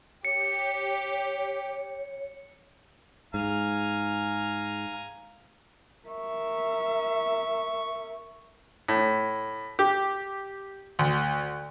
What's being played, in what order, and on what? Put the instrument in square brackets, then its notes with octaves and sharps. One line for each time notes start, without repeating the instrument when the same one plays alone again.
[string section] G4 [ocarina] C#5 [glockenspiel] C#7
[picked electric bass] G#2 [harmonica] F5 G#5 A#5
[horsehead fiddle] A#4 E5 [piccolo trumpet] C#6
[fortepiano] A2
G4
D2